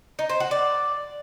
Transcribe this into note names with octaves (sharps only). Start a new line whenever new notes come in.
D#4
C5
F#4
D5